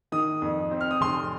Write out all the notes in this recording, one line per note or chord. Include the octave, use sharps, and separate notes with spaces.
D#3 D#6
F2
C4
F6
D#6
F1 C6